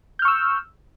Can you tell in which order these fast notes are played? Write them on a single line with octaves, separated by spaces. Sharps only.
G6 F6 C#6 E6